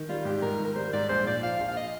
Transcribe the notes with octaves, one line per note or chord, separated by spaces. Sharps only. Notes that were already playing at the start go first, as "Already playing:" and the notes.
Already playing: D#3
G3 F4
G#2 G4
G#2 A#4
D#3
A#4
G3 C5
G#2 D5
A#1 C5
A#2 D5
F3 F5
A#1
F5
D#5